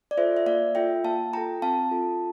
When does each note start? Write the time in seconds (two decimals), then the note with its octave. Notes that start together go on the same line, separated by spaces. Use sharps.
0.11 D5
0.17 F4 A4 C5 E5
0.37 E5
0.46 A#3 D5 F5
0.75 F4 A4 E5 G5
1.04 A#3 F5 A5
1.33 F4 A4 G5 A#5
1.62 C4 F5 A5
1.91 F4 A4